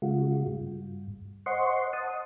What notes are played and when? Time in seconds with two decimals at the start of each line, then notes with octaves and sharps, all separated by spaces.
0.02 C#3 G#3 F4 F#4
0.47 G2
1.46 C5 D#5 F#5 C6 C#6
1.93 D#5 F#5 A5 D#6